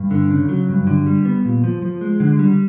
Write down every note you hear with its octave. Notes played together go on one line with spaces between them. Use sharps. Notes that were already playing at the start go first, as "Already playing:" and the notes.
Already playing: G2
D3
C#3
F#3
G2
D3
G3
B3
A#2
F3
F3
G#3
D3
G3